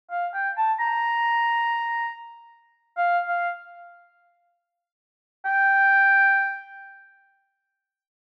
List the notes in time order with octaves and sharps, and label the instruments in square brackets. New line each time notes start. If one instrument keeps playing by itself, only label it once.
[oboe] F5
G5
A5
A#5
F5
F5
G5